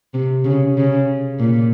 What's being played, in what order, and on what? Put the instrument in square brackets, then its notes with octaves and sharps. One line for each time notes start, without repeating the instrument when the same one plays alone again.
[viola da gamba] C3
C#3
C#3
A#2